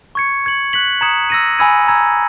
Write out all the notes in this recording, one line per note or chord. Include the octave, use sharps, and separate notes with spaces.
C#6 G#6 C#7
C#6 G#6 C#7 F#7
F#6 B6 F#7
A#5 D#6 G#6 C#7 E7
E6 A#6 D#7
G#5 B5 E6 G#6 D#7
A#5 E6 G#6